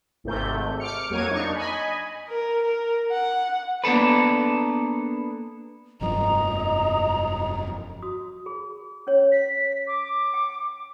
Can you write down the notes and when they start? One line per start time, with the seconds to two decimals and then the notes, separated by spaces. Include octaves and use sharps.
0.24 G#1 G#2 C3 A3 G6
0.80 D6 F6 C#7
1.10 F2 F#3 A#3 C#5 G#6 D#7
1.29 D4 D#4 C#6
1.55 D#5 G#5 B5
2.29 A#4
2.62 A#4
3.11 F#5
3.84 A#3 B3 D4 A4 B4
6.01 F1 G2 F3 D#5 A#5
8.02 F#4 D#6
8.46 G#4 B5
9.07 C#4 C#5
9.31 B6
9.86 D6
10.34 G5